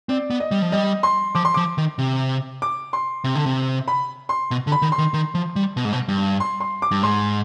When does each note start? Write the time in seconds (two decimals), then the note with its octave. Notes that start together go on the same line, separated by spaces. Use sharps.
0.09 C4 D5
0.30 B3
0.40 D#5
0.51 G3
0.62 F3
0.72 G3 D#5
1.03 C6
1.35 F3 D6
1.45 C6
1.54 F3 D6
1.78 D#3
1.98 C3
2.62 D6
2.93 C6
3.24 C3
3.35 D3
3.46 C3
3.88 B5
4.29 C6
4.51 B2
4.67 D3
4.72 B5
4.82 D#3
4.92 C6
4.98 D#3
5.14 D#3
5.35 F3
5.56 G3
5.77 B2
5.85 G#2
5.93 B2
6.08 G2
6.40 C6
6.60 C6
6.82 D6
6.91 G2
7.03 G#2 C6